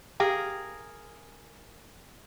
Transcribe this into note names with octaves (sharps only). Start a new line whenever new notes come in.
G4 G#4 A#4 F5 G5